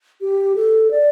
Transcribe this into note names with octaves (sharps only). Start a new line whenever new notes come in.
G4
A4
D5